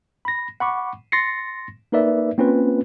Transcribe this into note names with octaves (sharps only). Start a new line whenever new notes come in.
B5 A#6
F#5 B5 C#6 D6
C6 A6 A#6 C7 C#7
A#3 D#4 A#4 B4 D5 E5
A#3 C4 C#4 F4 B4